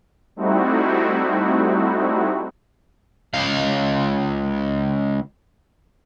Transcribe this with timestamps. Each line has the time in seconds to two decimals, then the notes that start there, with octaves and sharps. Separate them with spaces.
0.36 G3 A3 C4 D#4 E4 F#4
3.34 C#2 F5